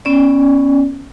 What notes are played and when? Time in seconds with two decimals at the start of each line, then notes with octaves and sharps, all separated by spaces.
0.05 B3 C#4 D5